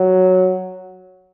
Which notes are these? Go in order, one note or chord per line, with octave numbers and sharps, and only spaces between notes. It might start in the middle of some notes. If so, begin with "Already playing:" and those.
Already playing: F#3